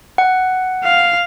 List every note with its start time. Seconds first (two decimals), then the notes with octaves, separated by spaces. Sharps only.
0.18 F#5
0.84 F5